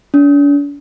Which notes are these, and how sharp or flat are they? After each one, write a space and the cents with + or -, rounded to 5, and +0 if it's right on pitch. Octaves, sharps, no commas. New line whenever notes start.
D4 -45